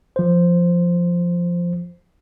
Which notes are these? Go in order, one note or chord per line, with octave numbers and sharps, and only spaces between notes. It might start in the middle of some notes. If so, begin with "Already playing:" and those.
F3 C5